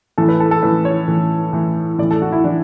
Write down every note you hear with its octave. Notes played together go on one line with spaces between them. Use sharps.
A2 E3 A4
B4
A4
A4
A2 E3 B4
C#5
A2 E3
A2 E3
A2 E3 D5
A4
F#4
E4
E3 D4